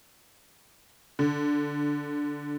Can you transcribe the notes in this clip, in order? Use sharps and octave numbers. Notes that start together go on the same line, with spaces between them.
D3